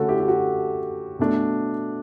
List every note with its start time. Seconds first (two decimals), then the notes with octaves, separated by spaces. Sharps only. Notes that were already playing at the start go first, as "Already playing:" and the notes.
Already playing: D3 A3 C#4 F#4 A4
0.09 E4 G4
0.20 G4
0.28 F#4
1.19 B2 A3 D4